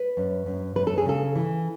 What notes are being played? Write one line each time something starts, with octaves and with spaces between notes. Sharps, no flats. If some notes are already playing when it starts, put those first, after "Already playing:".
Already playing: B4
F#2
F#2
F#2 B4
A4
G#4
C#3 A4
E3